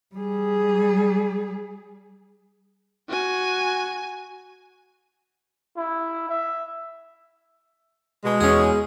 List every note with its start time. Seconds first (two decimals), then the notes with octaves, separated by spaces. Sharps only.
0.15 G3 G#4
3.08 F#4 G#5
5.77 E4
6.29 E5
8.24 B2 G#3
8.41 E2 B3 C#4 G#4